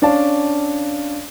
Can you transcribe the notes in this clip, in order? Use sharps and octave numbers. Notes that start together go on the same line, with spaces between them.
C#4 D4 D5 F5 A5